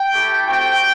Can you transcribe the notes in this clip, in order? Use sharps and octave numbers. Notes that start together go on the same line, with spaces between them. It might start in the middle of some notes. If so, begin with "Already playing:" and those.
Already playing: G5
A3 E4 G4
A3 C4 F#4 G5